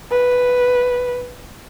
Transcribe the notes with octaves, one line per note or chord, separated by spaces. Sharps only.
B4